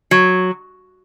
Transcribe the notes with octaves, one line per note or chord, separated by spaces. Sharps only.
F#3